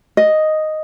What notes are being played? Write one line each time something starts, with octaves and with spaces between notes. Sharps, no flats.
D#5